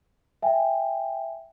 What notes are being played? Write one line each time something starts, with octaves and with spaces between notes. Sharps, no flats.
E5 G5 G#5